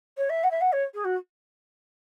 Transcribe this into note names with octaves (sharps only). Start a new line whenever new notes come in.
C#5
E5
F#5
E5
F#5
C#5
G#4
F#4